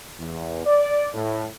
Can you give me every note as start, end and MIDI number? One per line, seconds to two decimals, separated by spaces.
0.19 0.63 40
0.66 1.08 74
1.14 1.46 45